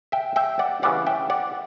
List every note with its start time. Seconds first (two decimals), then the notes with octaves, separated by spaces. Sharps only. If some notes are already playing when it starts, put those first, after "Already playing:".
0.12 E5 G5
0.36 E5 G5
0.59 D5 F#5
0.82 C#3 E3 G3 D5 F#5
1.07 E5 G5
1.30 D5 F#5